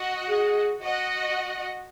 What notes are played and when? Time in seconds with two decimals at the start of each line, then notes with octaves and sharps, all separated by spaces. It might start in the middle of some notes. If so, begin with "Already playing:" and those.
Already playing: F#4 D#5 F#5
0.29 G#4
0.80 F#4 D#5 F#5